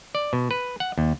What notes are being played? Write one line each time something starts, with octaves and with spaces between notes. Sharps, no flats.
D5
B2
B4
F#5
D#2